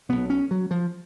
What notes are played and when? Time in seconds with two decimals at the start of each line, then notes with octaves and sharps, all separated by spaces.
0.09 B1 B2 B3
0.30 C#4
0.51 F#3
0.71 F3